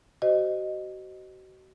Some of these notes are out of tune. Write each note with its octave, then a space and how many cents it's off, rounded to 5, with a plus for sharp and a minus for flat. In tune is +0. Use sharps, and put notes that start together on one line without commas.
F#4 +35 C5 -15 D#5 -15